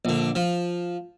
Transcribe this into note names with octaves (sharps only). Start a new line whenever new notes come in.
A#1 D3
F3